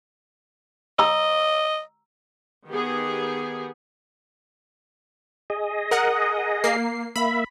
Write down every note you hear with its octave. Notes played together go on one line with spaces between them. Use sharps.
D#5 A#5 E6
D#3 B3 G4 G#4
G#4 D#5
A#4 F#5
A#3 C7
A#3 E5 B5